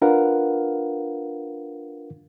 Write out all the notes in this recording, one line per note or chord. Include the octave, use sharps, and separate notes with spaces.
D4 F4 A#4 B4 F5 F#5